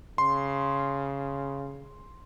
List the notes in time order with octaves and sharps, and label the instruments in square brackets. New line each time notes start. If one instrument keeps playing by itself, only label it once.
[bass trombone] C#3 [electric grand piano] C6